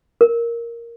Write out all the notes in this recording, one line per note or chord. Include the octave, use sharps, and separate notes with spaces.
A#4